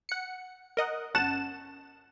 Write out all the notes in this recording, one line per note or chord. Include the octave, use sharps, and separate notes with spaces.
F#5 C#7
A#4 D#5 F#5
G1 C#4 F#5 A5 E7